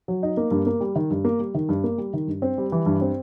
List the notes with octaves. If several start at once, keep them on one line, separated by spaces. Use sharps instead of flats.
F#3
D#4
A#3
G2
A#3
G3
D#3
G2
A#3
G3
D#3
G2
A#3
G3
D#3
G2
C4
G3
E3
G2
C4